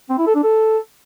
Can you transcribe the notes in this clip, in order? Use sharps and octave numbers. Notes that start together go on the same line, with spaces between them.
C4
E4
A4
D4
A4